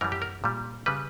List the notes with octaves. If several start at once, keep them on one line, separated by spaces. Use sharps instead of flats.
F#2 E3 G3 A#4
G4
A#4
A#2 G3
C#3 G3 B4